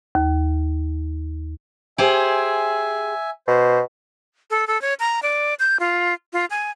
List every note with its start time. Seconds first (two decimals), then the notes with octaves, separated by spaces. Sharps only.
0.15 D#2
1.98 G4 G#4 C5 E5 G#5
3.47 B2 C5
4.50 A4
4.67 A4
4.82 C#5
5.00 A#5
5.23 D5
5.60 G6
5.80 F4
6.33 F4
6.50 G#5